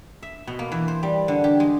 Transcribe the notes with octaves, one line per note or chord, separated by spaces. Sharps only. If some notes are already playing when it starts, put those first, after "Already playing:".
E5
B2
A#3
E3
C5
G3
D3
G4
G#3